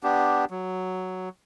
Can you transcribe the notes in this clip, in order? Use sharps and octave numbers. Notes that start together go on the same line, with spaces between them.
B3 D4 G4
F#3